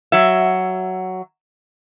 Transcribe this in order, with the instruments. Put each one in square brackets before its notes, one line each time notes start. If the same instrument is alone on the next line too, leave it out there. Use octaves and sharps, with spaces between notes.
[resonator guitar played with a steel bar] F#3 E5